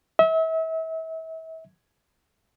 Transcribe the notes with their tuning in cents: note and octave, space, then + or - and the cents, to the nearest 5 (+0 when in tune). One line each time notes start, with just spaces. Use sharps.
E5 -35